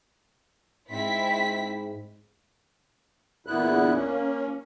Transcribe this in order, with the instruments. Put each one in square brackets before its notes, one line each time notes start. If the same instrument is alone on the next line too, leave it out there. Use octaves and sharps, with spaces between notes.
[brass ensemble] G#2 [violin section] C4 E4 B6
[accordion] E2 A#2 D3 B3 E4 F#6
A#3 C#4